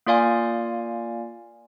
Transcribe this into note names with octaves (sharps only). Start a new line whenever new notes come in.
A#3 F4 D5 F5 G#5